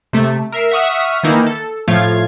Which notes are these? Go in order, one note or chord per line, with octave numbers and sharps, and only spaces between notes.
C3 A3
A#4 E5 C7
E5 F#5 C#6 D#6 F6
D#3 E3 A#3 D#4 E4
A4
A2 F3 A3 F4 F5 G#6